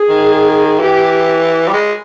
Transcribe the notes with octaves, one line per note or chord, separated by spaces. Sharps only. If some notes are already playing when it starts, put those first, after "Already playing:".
Already playing: G#4
D#3
E3 G4
G3
G#3